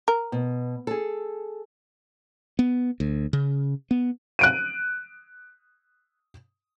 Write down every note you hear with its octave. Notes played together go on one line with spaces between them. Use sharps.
A#4
B2
G#4 A4
B3
D2
C#3
B3
F#6 D7 D#7